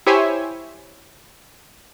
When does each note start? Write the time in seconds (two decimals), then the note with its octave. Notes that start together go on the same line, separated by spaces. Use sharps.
0.06 E4 G4 C5 C#5 E5 G#5